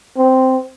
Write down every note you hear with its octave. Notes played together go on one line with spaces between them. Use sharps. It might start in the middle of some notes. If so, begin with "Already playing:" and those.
C4